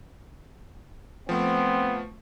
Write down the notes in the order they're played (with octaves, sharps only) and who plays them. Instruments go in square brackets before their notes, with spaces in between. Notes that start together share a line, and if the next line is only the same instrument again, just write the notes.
[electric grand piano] F3 A3 [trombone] B3 [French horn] C4